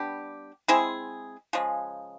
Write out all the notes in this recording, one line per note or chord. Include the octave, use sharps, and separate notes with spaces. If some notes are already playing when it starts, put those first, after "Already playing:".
Already playing: G3 B3 D4 G4
G#3 C4 E4 G#4
C#3 F3 G#3